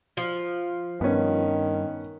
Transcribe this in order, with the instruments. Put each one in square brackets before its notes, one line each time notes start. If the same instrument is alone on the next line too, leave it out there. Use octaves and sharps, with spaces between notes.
[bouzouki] F3
[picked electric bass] G2 [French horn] D#3 [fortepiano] B3 C#4